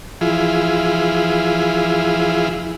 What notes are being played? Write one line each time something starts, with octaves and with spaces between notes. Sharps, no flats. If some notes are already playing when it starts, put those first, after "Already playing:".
E3 F3 E4 F4 G#4